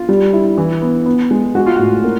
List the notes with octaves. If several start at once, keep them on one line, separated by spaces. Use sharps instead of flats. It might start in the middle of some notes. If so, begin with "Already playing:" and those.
Already playing: F4
G3
E4
E3
B3
B3
G#3
G#3 F#4
F4
A2 F#4
A#3